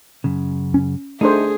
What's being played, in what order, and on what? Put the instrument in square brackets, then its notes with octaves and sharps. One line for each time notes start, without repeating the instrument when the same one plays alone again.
[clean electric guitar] F#2 C#3
[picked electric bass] C#4
[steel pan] A3 D4 C5 [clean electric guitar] D#4 [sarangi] G#4